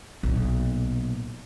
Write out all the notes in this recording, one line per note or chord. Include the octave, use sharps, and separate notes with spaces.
B1 A#2